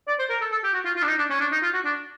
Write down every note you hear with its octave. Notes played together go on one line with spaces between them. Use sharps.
D5
C5
A#4
A4
A4
G4
F#4
F4
F4
D4
D#4
D4
C#4
D4
D#4
F4
F#4
D4